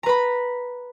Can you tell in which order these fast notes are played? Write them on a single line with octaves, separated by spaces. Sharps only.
A#5 B4 B5